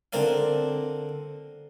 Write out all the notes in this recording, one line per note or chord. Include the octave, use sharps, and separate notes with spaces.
D3 C4 A#4 D5 F5